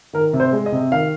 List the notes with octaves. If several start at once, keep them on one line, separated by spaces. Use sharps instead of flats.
D#3 A#4
C3
C5
G#3
D#5
C3
D#3 F5